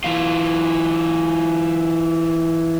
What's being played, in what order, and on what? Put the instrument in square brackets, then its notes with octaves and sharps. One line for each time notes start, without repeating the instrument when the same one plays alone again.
[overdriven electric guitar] E3 F4